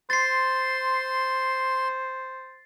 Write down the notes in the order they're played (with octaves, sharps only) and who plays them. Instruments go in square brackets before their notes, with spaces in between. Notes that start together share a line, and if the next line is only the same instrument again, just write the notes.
[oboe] C5 [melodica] C6 [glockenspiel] A6 C7